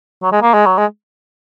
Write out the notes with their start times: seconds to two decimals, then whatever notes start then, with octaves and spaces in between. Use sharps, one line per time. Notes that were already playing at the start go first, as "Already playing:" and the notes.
0.22 F#3
0.32 G#3
0.42 A#3
0.54 G#3
0.66 F#3
0.78 G#3